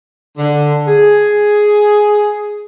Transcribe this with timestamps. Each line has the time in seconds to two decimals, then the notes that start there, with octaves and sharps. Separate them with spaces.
0.38 D3
0.87 G#4